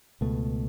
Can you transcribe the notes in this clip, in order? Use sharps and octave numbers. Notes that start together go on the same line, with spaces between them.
C#2 B2 A3